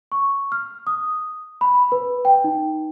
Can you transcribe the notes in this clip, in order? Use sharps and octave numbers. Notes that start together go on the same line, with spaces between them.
C#6
F6
D#6
B5
B4
G5
D#4